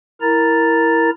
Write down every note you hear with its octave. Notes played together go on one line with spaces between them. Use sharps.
E4 A#4 A#5 A6